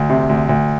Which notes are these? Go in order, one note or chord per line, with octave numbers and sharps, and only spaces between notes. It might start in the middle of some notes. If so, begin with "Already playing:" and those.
Already playing: D2
C3
D2
D2